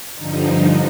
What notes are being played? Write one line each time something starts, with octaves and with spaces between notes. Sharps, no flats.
G2 D3 F3 D#4